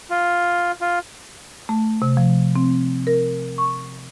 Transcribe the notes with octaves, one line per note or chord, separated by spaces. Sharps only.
F4
F4
A3
C3
F3
C4
A#4
C#6